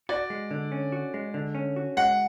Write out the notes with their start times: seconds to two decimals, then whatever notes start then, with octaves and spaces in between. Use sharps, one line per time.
0.09 F#4 D5
0.30 G#3
0.51 D3
0.72 C#4
0.92 F#4
1.14 G#3
1.34 D3
1.55 C#4
1.76 F#4
1.97 G#3 F#5